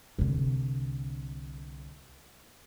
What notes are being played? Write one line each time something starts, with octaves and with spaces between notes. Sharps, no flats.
C2 D3